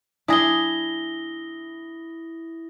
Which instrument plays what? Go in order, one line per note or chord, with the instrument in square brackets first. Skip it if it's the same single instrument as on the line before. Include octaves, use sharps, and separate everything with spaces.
[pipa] D4 G#4 [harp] E4 [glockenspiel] D#6 A#6 G7